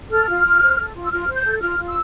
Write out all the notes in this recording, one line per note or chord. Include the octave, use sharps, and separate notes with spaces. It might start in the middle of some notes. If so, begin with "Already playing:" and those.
A4 F6
F4
F4
C5
A4
F4
E6
F4 F6
C5
G6
A4
F4 F6
F4
E6